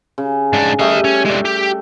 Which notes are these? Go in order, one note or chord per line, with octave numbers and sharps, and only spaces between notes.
C#3
G#2 D4
G3 A3 D#5 F5
C#4
G#3 D4
G4